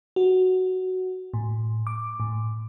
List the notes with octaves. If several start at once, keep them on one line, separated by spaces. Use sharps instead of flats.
F#4
A2
D6
A2